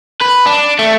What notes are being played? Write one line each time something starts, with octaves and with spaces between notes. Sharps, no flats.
B4
D4
A3